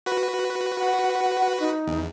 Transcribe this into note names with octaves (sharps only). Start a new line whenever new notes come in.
F#4 B4
F#5
D#4
E2